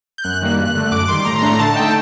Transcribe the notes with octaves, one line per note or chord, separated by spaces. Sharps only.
G6
F#2 F#6
D#3 G3 A#3
G2
D3 A3
F#2 D6
D#3 G3 C6
A2 A#5
C6
A3 D4 A#5
D3 A5
A3 D#4 G5